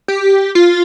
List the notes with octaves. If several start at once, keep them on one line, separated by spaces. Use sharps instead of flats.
G4
F4